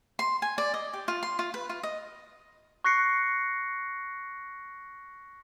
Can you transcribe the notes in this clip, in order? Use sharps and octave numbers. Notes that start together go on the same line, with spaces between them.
C6
G#5
D5
D#5
G4
F4
C6
F4
B4
F4
D#5
C#6 F#6 A#6 C7 C#7